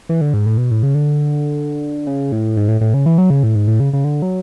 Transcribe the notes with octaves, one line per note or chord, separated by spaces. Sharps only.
E3
D3
G#2
A2
B2
A2
C#3
D3
C#3
A2
G#2
A2
A2
C#3
E3
F#3
C#3
A2
G#2
A2
C#3
C#3
D3
F#3